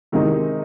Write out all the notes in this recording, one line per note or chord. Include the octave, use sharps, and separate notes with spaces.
C3 D#3 G#3 D#4